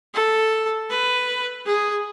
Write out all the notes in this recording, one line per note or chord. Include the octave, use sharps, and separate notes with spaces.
A4
B4
G#4